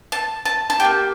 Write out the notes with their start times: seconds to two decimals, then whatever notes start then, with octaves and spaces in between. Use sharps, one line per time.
0.12 A5
0.46 A5
0.70 A5
0.80 D4 G4 G5
0.85 A#3